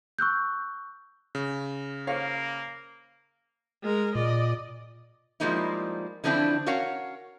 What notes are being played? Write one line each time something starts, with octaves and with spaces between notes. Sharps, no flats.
C#6 E6 F#6 G6
C#3
A#3 C5 C#5 F5
G#3 A#4
A#2 D5 D#5
F3 G3 G#3 A#3 D#4 E4
D3 E3 F3 C4 D4 E4
C#4 F#4 A#4 C#5 F5 F#5